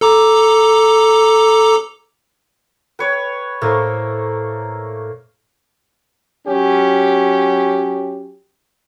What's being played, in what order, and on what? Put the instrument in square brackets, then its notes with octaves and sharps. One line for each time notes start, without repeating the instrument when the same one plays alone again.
[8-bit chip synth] A4 A#5 D6
[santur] B4 C#5 [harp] G5
[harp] A2 C5 D#5 [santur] A3 A#3
[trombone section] F#3 C#4 G4